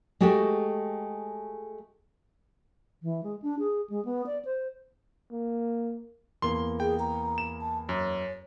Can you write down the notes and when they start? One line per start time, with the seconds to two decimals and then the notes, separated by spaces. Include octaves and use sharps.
0.20 G#3 A3 F#4 G4 A4 G5
3.03 E3
3.23 G#3
3.42 D4
3.59 G#4
3.90 G#3
4.05 B3
4.26 D5
4.45 C5
5.32 A#3
6.42 E2 A#3 C6 G7
6.80 G#4 G5
7.00 A#5
7.38 E7
7.60 A5
7.89 F#2 C#5